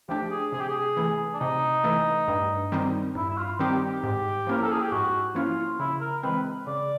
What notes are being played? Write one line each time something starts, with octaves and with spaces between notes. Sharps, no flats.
F3 A3 D4 G4
G#4
C3 G#4
G4
G#4
E3 A3
D4
C3 D#4
E3 A3
G2
D#3 G3 C4 D#4
G2 E4
E4
F4
D#3 G3 C4 D#4 G4
G4
G#2
F3 A#3 C#4 E4 A#4
A4
G#4
G4
G#2 F#4
F3 A#3 C#4 E4 F4
C#3 E4
A#4
E3 G#3 C4 B4
C#3 D5